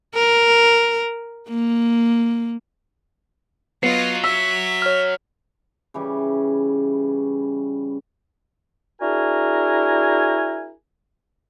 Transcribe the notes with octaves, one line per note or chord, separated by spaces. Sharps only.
A#4
A#3
F#3 B3 F4 D#5 C7
E5 E6 B6
C#5 F6
C#3 E3 G3 C#4
D4 E4 F#4 G#4 A#4 G#5